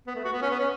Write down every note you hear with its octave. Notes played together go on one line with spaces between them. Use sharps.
B3
A3
F#4
B3
C#4
B3
C#4